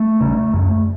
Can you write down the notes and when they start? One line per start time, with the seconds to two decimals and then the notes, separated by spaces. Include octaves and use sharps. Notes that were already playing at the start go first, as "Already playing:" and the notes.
Already playing: A3
0.21 C#3
0.54 F#2